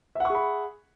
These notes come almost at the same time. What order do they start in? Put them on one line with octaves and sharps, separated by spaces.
E5 F#5 C#6 G#4 B5